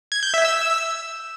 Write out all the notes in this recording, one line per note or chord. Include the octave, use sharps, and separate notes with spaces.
G#6
G6
E5
E6